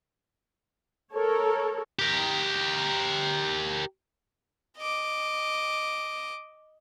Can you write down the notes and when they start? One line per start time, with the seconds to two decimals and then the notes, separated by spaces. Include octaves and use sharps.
1.14 A4 A#4 C#5
1.99 G4 A#4
4.78 D#5 D6